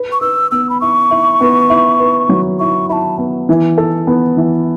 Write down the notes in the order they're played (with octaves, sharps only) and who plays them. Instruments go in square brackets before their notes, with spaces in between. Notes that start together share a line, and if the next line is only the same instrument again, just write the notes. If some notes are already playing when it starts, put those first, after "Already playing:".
Already playing: [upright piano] B4
[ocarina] C#6
[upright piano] B4 [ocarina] E6
[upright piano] B3 [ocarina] E6
[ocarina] B5
[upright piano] E4 [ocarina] C#6
[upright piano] E4
B3
E4
B4
F#3
[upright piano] E4 [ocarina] C#6
[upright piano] E4 [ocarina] B5
[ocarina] A5
[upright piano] B3
E3
A4
B3
E3